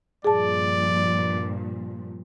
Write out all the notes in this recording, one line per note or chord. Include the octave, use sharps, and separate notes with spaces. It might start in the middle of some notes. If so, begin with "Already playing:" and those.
G2 A#2 F3 G#4 D5 A5